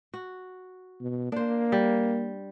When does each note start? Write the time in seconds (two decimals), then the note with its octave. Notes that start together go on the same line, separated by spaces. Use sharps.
0.14 F#4
1.01 B2
1.32 A#3 D4 C5
1.72 G3